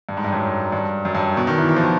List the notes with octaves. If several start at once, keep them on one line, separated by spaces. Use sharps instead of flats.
G2
G#2
G2
F#2
G2
F#2
G2
B2
D#3
E3
E3
F3
D#3